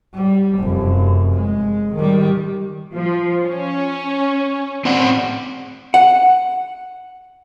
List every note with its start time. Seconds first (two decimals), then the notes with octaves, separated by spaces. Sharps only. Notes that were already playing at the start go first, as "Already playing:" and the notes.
0.15 G3
0.59 F1 F#2
1.35 G#3
1.95 D#3 G3
2.94 F3
3.45 C#4
4.85 C4 D5 F#5
5.94 F#5